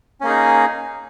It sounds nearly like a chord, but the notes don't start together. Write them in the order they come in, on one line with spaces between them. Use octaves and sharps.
C#4 A#3 G#4 D#4